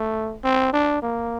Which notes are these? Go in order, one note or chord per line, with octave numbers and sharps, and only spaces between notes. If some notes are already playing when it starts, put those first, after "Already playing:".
Already playing: A3
C4
D4
A#3